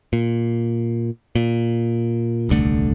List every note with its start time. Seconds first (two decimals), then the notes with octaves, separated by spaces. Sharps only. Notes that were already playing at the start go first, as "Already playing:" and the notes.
0.13 A#2
1.35 A#2
2.49 D#1 C2 D3 A3